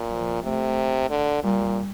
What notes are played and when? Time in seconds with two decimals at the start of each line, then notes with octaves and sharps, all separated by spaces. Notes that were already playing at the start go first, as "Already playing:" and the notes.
Already playing: A#2
0.11 F3
0.43 C3 A3
1.10 D3
1.44 A#2 G3